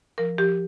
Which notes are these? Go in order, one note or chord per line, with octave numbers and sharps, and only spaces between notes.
F3 A#4
F3 G4